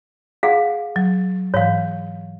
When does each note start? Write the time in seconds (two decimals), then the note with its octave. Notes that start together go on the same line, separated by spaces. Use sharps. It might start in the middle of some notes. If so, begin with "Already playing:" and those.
0.43 G#4 F5 F#5
0.96 F#3
1.54 G#2 E3 C#5 F5